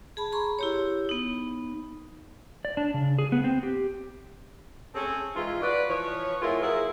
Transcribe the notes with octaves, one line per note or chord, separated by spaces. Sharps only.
G#4 A5 B5
G#4 A#5 C6 C#6
E4 G4 C#5
B3 D#4
D5
D4
C#3
G#4
B3
C4
G4
A3 C4 C#4 G#4
G#2 E3 G#3 F4
F#4 B4 D5
E3 F3 B4 C#5
G#3 B3 E4 F4 A#4
F#3 A#3 E4 G#4